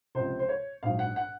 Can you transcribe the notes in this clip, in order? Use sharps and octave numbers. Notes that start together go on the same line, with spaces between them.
C#2 C3 F3 C5
C5
C#5
A#1 G#2 F#3 F5
F#5
F#5